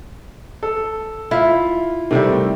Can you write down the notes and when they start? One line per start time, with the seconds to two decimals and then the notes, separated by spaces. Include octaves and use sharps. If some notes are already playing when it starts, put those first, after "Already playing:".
0.63 A4
1.31 E4 F4
2.11 C3 D#3 G3 A3 C4